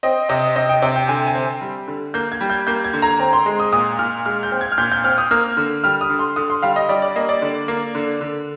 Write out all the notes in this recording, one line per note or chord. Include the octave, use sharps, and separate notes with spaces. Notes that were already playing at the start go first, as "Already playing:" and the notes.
C4 D#5
C3 D#5
C3 D#5
G5
C3 G5
G5
D3 G#5
G#5
C4
G3
D3
A#3 G6
G#6
G3
G6
A#3 G6
G#6
D3
A#5
C4 A#5
C6
G#3
D#6
A#2 D#6
A#2 F6
G#3 F6
G6
C4
G#6
F6
A#2 G6
G6
C4 F6
D#6
A#3 F6
D3
G3 F6
D#6
D3
C6
D3 D#6
C6
G3 F5
D#5
G3 D5
D5
A#3 D#5
D5
D3
A#3
D3
D3